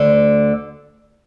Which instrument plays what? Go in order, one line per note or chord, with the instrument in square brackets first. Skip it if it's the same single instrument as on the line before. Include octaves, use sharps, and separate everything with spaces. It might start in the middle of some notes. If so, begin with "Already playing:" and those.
Already playing: [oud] D2 D3